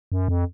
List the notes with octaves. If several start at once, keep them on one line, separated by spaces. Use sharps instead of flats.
F#2
F2